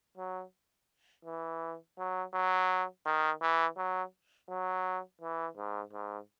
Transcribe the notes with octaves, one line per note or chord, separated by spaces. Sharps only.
F#3
E3
F#3
F#3
D#3
E3
F#3
F#3
E3
G#2
G#2